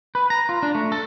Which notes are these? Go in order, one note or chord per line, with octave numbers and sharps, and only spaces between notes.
B4
A#5
F4
D4
A3
A4